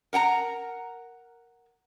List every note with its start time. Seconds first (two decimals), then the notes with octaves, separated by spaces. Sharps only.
0.13 A#4 F#5 G5 A#5